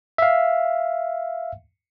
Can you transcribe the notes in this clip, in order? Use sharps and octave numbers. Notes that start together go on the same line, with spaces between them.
E5 F5